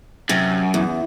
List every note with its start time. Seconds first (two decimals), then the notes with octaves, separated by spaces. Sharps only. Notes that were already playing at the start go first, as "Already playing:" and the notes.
0.29 F#2 C3
0.74 E2